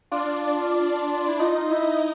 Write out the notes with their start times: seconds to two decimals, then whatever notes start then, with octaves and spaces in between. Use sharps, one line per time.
0.11 D4 F4 D5
1.28 E4
1.40 D#4 F4 D#5
1.71 E4